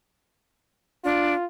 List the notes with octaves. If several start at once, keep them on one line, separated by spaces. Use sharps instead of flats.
D4 F4